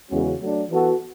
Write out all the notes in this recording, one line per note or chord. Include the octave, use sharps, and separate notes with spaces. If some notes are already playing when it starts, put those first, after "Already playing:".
E2 C#3 G#3 C#4 F#4
F#3 A3 D4
E3 B3 F#4 A4